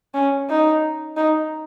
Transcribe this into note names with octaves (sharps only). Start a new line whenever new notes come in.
C#4
D#4
D#4